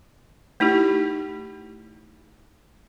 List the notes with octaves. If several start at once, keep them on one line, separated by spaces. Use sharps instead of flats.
A3 D#4 E4 G4